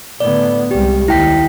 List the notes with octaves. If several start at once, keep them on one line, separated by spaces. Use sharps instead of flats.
A2 D3 B3 D5
C2 G3 G#3 G4
D#2 E4 G5 B6